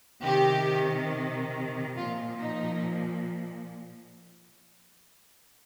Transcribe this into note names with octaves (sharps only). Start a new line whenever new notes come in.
C3 D#3 G4
A#2 F3 F4
D#4